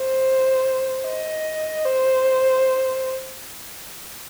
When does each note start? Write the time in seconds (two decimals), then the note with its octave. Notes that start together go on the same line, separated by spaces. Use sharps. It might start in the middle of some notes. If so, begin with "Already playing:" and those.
Already playing: C5
1.05 D#5
1.85 C5